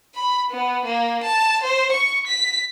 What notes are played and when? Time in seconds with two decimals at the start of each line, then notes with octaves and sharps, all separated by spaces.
0.15 B5
0.50 B3
0.85 A#3
1.23 A5
1.63 C5
1.92 C#6
2.27 B6